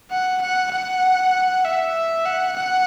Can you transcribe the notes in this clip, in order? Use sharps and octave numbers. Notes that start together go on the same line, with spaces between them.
F#5
F#5
F#5
E5
F#5
F#5